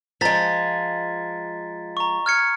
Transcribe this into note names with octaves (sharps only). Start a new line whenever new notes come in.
F3 G#3 A#5 A6 B6
A#5 C#6
F6 G#6 C#7